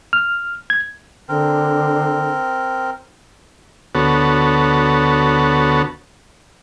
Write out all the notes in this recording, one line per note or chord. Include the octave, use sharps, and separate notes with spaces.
F6
G#6
D3 C4 A#4
D2 B3 F#4 A4 C#5